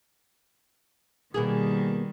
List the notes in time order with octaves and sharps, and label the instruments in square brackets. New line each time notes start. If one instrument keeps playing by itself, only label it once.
[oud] B2 A#3 G#4 [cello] D#3 G3